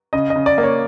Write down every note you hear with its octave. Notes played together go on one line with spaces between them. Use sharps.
C#3 D#5
D#5
C#3
D5
A#3
C#5